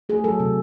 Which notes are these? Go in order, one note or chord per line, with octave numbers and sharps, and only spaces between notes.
A3 G#4
F#3 A4
C3